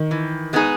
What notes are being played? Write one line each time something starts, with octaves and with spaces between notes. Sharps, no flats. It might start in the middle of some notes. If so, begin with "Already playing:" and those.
Already playing: D#3
E3
G#3 B3 D#4 G#4